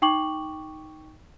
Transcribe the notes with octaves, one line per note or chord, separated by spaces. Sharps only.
D#4 G5 C#6 D6 F#7